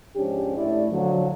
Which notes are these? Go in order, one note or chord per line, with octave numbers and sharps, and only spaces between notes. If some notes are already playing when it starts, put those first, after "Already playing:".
G#2 F3 C#4 D4 G4
A2 A3 E4 D5
D3 F3 F#3